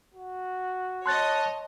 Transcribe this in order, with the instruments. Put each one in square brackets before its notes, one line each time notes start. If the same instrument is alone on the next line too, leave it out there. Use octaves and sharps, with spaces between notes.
[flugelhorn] F#4
[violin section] C#5 D#5 [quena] A5 [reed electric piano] C6 F#6 A6